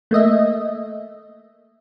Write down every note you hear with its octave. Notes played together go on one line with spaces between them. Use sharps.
A3 A#3 D#5 E5